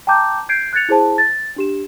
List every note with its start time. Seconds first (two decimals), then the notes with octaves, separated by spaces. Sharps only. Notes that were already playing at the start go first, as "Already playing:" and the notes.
0.07 G5 A5 A#5 D6 G6
0.49 G6 G#6 C7 D7
0.73 F#6 G#6 A6 C#7 F7
0.89 E4 G#4 C5 A5
1.18 A6
1.56 D4 G4 E7